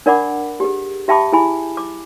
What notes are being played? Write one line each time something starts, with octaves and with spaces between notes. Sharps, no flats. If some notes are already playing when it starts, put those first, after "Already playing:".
D4 A#4 D5 F#5 B5 D6
G4 G#4
G4 E5 G5 A5 B5 D6
E4 G#4 G#5 B5
D6